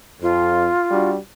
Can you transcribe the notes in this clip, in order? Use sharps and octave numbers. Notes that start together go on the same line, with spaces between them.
F2 F4
G3 D4 F#4